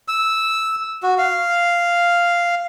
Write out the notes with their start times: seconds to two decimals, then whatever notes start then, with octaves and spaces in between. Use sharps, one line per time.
0.08 E6
1.03 F#4
1.18 F5